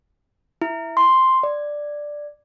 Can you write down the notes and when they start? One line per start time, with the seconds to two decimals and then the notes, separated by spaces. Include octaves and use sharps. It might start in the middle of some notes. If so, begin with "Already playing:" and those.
0.62 E4
0.97 C6
1.43 D5